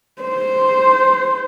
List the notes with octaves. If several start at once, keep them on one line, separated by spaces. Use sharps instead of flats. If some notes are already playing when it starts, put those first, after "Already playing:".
C5